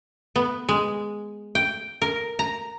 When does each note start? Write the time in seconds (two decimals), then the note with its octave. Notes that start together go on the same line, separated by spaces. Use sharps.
0.36 B3
0.69 G#3
1.55 G5
2.02 A#4
2.39 A#5